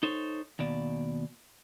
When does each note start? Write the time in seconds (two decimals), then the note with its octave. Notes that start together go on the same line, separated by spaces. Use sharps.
0.03 D#4 A4 C5 C#5
0.59 D#2 B2 D5